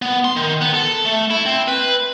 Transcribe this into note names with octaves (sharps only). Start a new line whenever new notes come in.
B3
C6
D#3
B3
A4
A3
E4
C4
B4